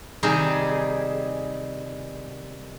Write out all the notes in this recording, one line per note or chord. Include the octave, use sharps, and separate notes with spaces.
C3 D#3 G3 G#4